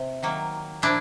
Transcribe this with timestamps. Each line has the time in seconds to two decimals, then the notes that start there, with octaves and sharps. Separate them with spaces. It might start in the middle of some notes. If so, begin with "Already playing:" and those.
Already playing: C3
0.23 D#3 F#3 A#3
0.82 A#2 F3 D4 E4